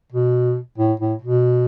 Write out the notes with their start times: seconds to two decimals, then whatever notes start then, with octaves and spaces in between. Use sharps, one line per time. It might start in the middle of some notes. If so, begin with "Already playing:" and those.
0.12 B2
0.78 A2
0.99 A2
1.22 B2